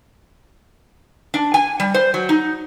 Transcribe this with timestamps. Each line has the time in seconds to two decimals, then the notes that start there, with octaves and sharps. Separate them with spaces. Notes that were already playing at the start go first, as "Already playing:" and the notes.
1.34 D4
1.54 G#5
1.80 G3
1.94 C5
2.14 F#3
2.29 D#4